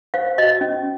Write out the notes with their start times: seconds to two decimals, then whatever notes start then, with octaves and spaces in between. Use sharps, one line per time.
0.14 C5 F5
0.38 F#4 D#5
0.61 C#4